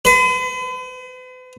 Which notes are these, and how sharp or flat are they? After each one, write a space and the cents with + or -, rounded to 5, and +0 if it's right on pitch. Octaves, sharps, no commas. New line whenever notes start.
B4 +45